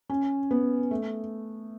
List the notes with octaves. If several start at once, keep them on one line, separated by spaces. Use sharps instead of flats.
C#4
B3
A3